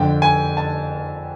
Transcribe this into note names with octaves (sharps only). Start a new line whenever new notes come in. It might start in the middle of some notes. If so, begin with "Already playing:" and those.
Already playing: F2 D3 G5
G#5
A5